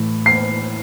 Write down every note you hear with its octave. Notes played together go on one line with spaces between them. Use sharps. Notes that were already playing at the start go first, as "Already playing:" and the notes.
Already playing: A2 E3
C7